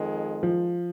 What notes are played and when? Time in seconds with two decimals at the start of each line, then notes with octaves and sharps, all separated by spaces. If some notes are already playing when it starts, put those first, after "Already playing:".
Already playing: F2 D#3 G#3
0.43 F3